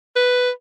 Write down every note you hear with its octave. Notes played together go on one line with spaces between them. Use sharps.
B4